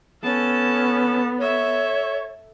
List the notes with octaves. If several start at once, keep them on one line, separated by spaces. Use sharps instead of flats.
B3 C#4 A4 A5
A4 C#5 E5